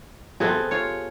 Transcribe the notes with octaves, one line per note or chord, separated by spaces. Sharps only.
C3 B3 C4 G#4 A4
F4 C#5